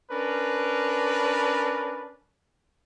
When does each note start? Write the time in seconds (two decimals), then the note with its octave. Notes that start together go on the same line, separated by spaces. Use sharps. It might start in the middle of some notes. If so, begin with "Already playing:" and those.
0.11 C#4 D4 A#4 B4